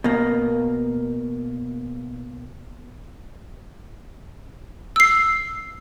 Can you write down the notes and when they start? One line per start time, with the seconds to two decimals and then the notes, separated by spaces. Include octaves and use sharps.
0.04 B2 A#3
4.96 E6 C7